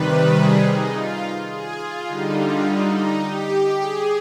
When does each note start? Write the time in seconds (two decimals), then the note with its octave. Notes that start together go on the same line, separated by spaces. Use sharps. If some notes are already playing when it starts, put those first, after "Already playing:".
Already playing: C3 D#3 G3 B4
0.34 G#4
0.62 D#4
0.92 F4
1.49 G#4
1.78 F4
2.07 D3 G3 D#4
2.36 F4
2.65 D#4
2.94 D#4
3.22 G4
3.81 G#4